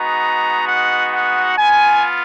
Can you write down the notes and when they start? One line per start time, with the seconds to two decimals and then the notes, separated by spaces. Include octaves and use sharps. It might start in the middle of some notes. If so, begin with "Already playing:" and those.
Already playing: G#3 B3 D#4 F#4 A#5
0.67 F#5
1.12 F#5
1.57 B3 F4 G#5